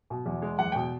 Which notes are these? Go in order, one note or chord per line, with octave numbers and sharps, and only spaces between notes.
B2
E2
G#3
E2 F#5
B2 G5